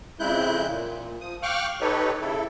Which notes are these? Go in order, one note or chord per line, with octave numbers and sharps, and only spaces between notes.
F2 C#3 G#3 E4 F#6 G6
A#2
F3 D#6
F5 G5 C#6 D6 F6 F#6
D#4 G4 A4 B4 C#5
C#3 E4 A4